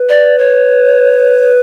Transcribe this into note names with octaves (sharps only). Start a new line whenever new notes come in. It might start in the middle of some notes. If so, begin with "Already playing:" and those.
Already playing: B4
D5
C#5